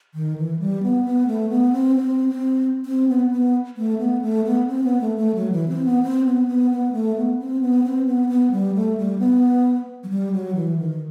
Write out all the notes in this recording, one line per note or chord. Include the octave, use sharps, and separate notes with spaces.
D#3
E3
G3
B3
B3
A3
B3
C4
C4
C4
C4
B3
B3
A3
B3
A3
B3
C4
B3
A3
A3
F#3
E3
C4
B3
C4
B3
B3
B3
A3
B3
C4
B3
C4
B3
B3
G3
A3
G3
B3
F#3
G3
F#3
E3
D#3